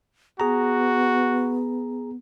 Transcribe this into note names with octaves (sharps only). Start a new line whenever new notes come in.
B3 F#4 G#4 A#5